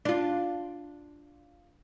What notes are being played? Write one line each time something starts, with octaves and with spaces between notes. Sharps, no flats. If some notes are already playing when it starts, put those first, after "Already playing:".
D4 F4